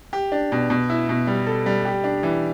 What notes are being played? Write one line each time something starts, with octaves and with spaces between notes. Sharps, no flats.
G4
D4
B2
B2
E4
B2
G3
A4
G3
G4
D4
E3